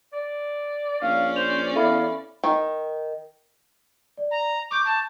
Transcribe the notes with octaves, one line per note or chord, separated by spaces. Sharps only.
D5
A#1 C#4 D5 F5
C5 F7
E2 A4 E5 F5 B5
D#3
D5
A#5
C#6 D6 G6
A5